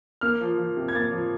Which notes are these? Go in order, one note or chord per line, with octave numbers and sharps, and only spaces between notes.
A#3 F6
F3
F3
C3
G#6
A#3 A6
F3